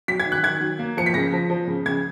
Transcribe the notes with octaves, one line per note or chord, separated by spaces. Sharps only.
F#3 B6
G#6
D#3
F#6
D#3 G#6
F#3
A#3
F3 C#7
B6
C#3 A#6
F3
F3
C#3
C#3 G#6